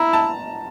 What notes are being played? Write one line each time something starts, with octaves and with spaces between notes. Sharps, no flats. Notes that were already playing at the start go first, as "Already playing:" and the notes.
Already playing: E4 A#5
A5